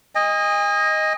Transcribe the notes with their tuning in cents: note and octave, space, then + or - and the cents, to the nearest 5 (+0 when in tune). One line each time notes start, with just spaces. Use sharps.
D#5 +0 G#5 -40